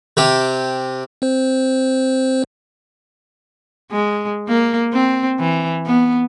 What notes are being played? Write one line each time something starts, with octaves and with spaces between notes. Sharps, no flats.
C3 G4
C4 C5
G#3
A#3
C4
E3
B3